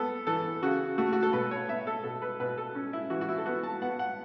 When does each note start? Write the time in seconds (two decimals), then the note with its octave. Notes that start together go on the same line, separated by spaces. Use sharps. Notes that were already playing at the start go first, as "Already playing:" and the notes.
Already playing: B3 A4
0.27 E3 A4
0.62 C#3 F#4
0.98 A3 F#4
1.13 F#4
1.23 A4
1.33 B2 B4
1.51 C#5
1.68 B3 E5
1.87 A4
2.04 B2 A4
2.22 B4
2.40 B2 B4
2.57 A4
2.75 C#4
2.93 E4
3.10 E3 F#4
3.21 F#4
3.28 E4
3.38 A4
3.46 B3 F#4
3.63 A5
3.81 B3 F#5
3.99 F#5